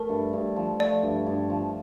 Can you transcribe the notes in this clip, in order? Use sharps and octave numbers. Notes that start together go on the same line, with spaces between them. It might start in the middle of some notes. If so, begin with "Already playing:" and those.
Already playing: A3 A#4
G2
G2
F3
A3 D5
G2
G2
F3